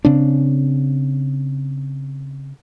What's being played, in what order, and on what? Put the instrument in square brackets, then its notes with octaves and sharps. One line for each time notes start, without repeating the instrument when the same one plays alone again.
[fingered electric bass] C#3 C4 D4